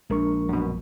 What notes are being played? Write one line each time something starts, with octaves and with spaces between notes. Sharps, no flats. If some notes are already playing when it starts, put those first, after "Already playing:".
A#1 G#3 D4 A#4 C#6
F#2 B2